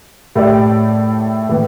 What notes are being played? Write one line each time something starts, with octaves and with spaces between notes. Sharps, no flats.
A2 A3 G4 D5
A2 E3